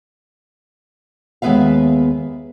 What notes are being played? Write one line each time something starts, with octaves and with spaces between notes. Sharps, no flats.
D#2 G#3 B3 B4 E5 F5